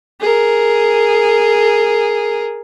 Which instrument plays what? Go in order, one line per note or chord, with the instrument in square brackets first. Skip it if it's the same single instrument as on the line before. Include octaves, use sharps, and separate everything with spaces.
[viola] G#4 A#4